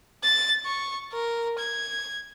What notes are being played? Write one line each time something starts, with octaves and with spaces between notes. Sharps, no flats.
A6
C#6
A#4
G#6